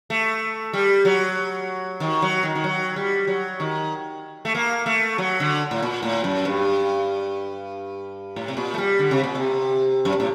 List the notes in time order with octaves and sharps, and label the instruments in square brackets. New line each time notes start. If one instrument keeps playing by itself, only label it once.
[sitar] A3
G3
F#3
D#3
F#3
D#3
D#3
F#3
G3
F#3
D#3
A3
A#3
A3
F#3
D3
A2
A#2
A2
F#2
G2
A2
C3
A#2
A3
G3
D3
C3
A#2
C3
F#2
A2